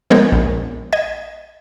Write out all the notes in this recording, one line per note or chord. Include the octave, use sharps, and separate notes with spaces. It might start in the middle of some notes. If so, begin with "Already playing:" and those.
F3 G#3 B3 A#4 C#5 G6
A#1
D#5 G#6